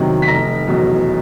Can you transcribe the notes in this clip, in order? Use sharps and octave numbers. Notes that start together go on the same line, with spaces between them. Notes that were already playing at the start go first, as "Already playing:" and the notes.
Already playing: E2 C3 D#3 F#3
B6
F1 A#5 A#6
E2 B2 F#3